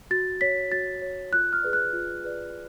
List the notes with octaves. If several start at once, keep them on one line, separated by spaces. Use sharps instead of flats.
F#4 A6
C#5 B6
F#4 A6
C#5
F4 F#6
F6
G#4 B4 D5
F#6
F4
G#4 B4 D5